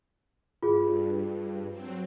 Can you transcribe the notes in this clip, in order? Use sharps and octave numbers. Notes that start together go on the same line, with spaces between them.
G2 F4 G#4
F#3 C4